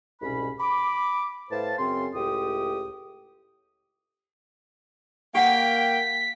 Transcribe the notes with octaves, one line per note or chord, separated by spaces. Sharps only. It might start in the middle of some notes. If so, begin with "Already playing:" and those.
C2 G#2 B2 C#4 B5
B5 D6
A2 B4 C5 F5 A5
F#2 C#3 C4 C#4 C6
C#2 A2 G4 G5 D#6
A#3 G4 F#5 G5 B6